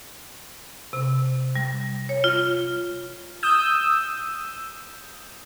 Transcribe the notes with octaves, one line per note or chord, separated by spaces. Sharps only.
C3
G3
C#5
F4
D#6 E6 G6